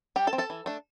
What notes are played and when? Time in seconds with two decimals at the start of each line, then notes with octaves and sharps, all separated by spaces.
0.16 G3 G4 G5
0.27 A4 A5
0.33 C4
0.38 A4 A5
0.50 E3
0.66 A3 D4